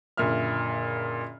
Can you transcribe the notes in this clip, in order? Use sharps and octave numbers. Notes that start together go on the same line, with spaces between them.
F#1 A#2 D3 E5 F6